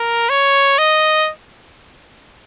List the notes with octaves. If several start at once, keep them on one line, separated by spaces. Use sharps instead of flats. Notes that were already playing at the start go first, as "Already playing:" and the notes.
Already playing: A#4
C#5
D#5